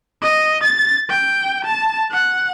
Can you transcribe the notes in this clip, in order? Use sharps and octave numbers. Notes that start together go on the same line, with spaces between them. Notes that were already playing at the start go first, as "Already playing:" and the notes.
D#5
A6
G5
A5
F#5